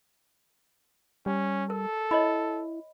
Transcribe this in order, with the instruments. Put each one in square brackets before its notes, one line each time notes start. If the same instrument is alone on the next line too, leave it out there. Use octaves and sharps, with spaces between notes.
[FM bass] G3 [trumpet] C#4
[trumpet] A4 [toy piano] A#4
[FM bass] E4 [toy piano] C#5 D#5 B5